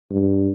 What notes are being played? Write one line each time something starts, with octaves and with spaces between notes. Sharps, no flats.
G2